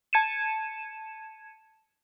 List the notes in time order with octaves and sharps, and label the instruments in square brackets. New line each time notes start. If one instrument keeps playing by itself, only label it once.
[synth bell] A5 G#6 C#7 D#7 E7